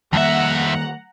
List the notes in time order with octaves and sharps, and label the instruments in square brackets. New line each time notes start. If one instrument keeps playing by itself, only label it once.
[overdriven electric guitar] F2 E5 [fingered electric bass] D#3 G3 A#3 [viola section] F#5 A#5